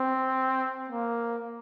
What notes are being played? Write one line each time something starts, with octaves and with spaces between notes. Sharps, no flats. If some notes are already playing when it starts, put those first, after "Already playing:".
Already playing: C4
A#3